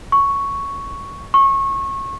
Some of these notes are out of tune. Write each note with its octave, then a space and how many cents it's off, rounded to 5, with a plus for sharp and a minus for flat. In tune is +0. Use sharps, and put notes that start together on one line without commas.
C#6 +5
C#6 -25